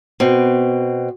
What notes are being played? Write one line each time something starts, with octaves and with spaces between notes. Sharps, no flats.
B2 C4